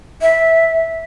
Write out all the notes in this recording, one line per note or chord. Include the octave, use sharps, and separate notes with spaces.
E5